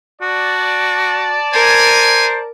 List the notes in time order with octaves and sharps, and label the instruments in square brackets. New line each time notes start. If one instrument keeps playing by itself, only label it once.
[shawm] F#4 [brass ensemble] D5 A5
[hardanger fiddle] A#4 [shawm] C5 [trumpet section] G#5